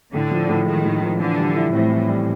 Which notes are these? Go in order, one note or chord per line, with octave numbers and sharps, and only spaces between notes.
A2 D3
F3
A2
D#3 G#3
A2
F3
D3 E3
G3
E4
A2 C4
E3
G3